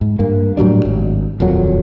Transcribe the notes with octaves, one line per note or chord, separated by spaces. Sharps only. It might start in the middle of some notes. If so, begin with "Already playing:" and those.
G#2
G2 A#3
A2 F#3 G3 D4
G#1
D#1 F2 A#2 F#3